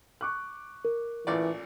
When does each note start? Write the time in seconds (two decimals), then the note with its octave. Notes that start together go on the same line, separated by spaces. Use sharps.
0.21 C#6 D6 F#6
0.85 A#4
1.27 A1 A#2 E3 D5